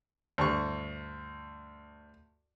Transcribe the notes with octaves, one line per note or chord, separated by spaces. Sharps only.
D2 G2 C#6